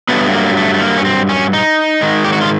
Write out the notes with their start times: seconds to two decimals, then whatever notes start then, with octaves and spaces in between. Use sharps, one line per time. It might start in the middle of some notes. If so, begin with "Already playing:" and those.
0.09 G2 D#3 F#3 A3 B3
0.33 A#3
0.57 A3
0.74 A3
0.81 A#3
0.98 C#4
1.05 C4
1.29 C#4
1.53 D#4
2.01 G#2 D#3 G#3
2.24 G4
2.33 F#4
2.41 F4